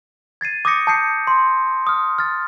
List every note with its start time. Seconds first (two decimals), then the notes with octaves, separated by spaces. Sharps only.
0.41 G#6 A6 C7 D#7
0.65 D6 D#6 G6 A#6 C#7
0.87 A5 D#6 G6 C7 C#7
1.27 C6
1.87 D#6 F6
2.19 F6 A6